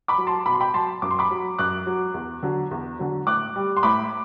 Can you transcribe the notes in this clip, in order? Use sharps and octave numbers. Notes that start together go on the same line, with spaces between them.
B5 D6
F#3
A5 C6
B2 B5
C6
G5 B5
F#3 A5 C6
F#2 D6
C6
B5 D6
F#3
F#2 D6 F#6
F#3
E2
D3 F#3
E2
D3 F#3
A2 D6 F#6
G3
C6
A2 B5 D6